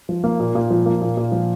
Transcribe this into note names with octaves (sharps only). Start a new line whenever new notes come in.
F3
A#3
A#2
A#2
F3
A#3
A#2
A#2
F3